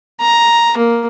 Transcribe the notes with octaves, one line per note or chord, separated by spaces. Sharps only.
A#5
A#3